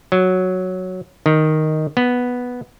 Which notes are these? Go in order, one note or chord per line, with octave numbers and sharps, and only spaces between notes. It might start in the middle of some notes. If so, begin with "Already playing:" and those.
F#3
D#3
B3